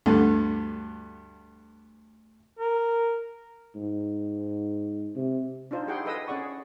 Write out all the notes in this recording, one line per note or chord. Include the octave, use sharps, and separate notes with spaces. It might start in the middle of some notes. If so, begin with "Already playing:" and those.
D2 G2 D3
A#4
G#2
C3
D4 D#4 F4 C5
E4 G4 G#4 F#5 G5 C6
G#4 A4 B4 D#5 D#6 E6
C#4 G#4 D5 F#5 C#6